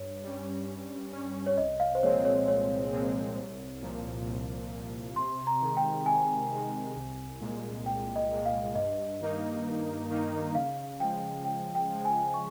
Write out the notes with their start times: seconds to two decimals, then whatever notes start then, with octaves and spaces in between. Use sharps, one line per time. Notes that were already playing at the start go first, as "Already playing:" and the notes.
Already playing: G2 C#5
0.23 G3 C#4
0.68 G2
1.13 G3 C#4
1.46 C#5
1.58 C2 D#5
1.80 F5
1.95 C5
2.03 A#2 F3 G#3 C4 C#5
2.25 C#5
2.47 C2 C#5
2.92 A#2 F3 G#3 C4
3.37 C2
3.82 A#2 F3
4.27 C2
4.71 A#2 F3
5.16 C3 C6
5.47 A#5
5.62 D#3 G#3
5.77 G5
6.06 C3 G#5
6.51 D#3 G#3
6.96 C2
7.40 A#2 G#3
7.86 C2 G5
8.16 D#5
8.31 A#2 G#3
8.46 F5
8.75 G2 D#5
9.21 D#3 A#3 D#4
9.65 G2
10.10 D#3 A#3 D#4
10.55 C#3 F5
11.00 F3 G#3 G5
11.45 C#3 G5
11.75 G5
11.89 F3
11.94 G#3
12.05 G#5
12.34 C#6